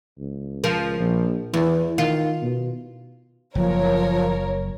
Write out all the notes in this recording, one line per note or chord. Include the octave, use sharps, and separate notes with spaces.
C#2
F3 A#4
A#1
E2 E3
D#3 F4
B2
F#1 F3 A#4 C#5